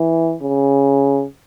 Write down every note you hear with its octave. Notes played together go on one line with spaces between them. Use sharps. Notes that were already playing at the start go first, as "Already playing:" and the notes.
Already playing: E3
C#3